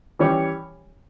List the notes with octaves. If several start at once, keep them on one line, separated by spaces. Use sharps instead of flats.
E3 G3 C#4 G4 C#5